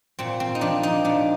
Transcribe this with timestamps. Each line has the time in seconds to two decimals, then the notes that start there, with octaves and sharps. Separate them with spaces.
0.19 A#2 C4
0.40 C4
0.55 D#4
0.61 F3 D4
0.83 D#4
1.05 A#2 D4